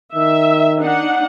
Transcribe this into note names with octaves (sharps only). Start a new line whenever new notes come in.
D#3 E5
D4 D#4 F#5